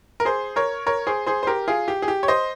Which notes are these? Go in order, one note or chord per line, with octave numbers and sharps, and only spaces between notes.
A#4
G#4 C5
A#4 C#5
A#4 C#5
G#4 C5
G#4 C5
C5
G4 A#4
F4 G#4
G4
G#4
G4
C#5
C5 D#5